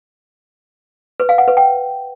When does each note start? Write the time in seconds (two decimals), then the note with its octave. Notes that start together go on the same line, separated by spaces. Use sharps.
1.20 B4
1.29 F5
1.38 F#5
1.48 B4
1.57 G5